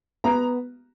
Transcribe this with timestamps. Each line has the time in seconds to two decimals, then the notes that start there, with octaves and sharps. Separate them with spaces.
0.24 B3 A#5